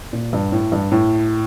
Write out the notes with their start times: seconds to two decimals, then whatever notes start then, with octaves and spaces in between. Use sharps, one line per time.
0.13 A#2
0.33 G2
0.52 A2
0.72 G2
0.91 A2